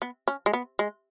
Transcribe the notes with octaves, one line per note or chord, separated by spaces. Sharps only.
B3
C#4
G#3
B3
G#3